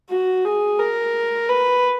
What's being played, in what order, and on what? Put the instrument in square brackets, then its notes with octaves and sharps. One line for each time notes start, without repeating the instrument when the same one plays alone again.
[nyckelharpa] F#4
G#4
A#4
B4